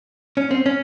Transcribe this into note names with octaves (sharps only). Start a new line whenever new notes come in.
C#4
C4
C#4